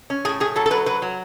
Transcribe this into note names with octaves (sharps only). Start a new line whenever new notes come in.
C#4
A2 G#4
A2 G#4
F#3 A4
A4
F#3 B4
F#3 B4
F#3